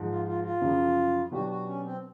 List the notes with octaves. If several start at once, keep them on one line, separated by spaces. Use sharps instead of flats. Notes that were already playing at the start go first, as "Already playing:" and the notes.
Already playing: G#2 F3 G#3
F4
F4
F4
F#2 C#3 F3
B2 F#3 B3 D4 F#4 G4
F#4
C#4
C4